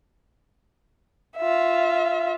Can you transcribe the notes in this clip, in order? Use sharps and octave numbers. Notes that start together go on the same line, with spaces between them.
F4 E5